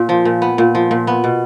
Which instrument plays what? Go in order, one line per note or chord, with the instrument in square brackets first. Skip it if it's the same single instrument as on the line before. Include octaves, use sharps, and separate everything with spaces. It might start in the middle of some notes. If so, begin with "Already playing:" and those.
Already playing: [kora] A#2
F3
A#2
B3
A#2
F3
A#2
B3
B2